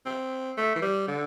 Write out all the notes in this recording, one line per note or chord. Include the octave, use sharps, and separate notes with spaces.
C4
A3
E3
G3
D3